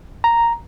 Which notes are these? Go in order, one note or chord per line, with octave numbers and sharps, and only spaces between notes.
A#5